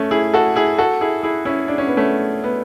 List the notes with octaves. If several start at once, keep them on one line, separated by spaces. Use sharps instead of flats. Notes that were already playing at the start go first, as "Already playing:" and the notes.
Already playing: A3 C#4
E4 G#4
F#4 A4
E4 G#4
F#4 A4
E4 G#4
E4 G#4
C#4 E4
D4
C#4
B3
A3 C#4
B3